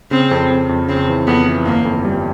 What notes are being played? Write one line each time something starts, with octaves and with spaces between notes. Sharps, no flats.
C#3 C4
F2
F2
F2
C#3 C4
E3
F2 B3
E3
G1 A#3
F2
G3